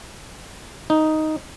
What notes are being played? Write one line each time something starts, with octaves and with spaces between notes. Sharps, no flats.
D#4